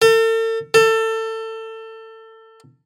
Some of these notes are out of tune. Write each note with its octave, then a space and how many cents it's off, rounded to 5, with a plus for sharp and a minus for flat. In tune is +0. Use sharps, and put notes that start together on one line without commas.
A4 +40
A4 +25